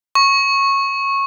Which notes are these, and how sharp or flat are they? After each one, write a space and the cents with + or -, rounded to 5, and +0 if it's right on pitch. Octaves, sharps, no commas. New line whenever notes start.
C#6 -15